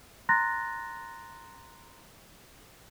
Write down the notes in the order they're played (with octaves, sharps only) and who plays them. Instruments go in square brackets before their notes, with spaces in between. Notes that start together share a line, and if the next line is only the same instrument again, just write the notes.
[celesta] A#5 C6 F#6 A6 A#6